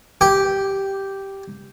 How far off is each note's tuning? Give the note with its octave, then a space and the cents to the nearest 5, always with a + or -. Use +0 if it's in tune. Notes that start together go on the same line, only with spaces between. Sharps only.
G4 -5